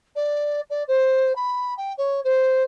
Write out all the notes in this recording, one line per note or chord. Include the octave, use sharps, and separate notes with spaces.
D5
D5
C5
B5
G5
C#5
C5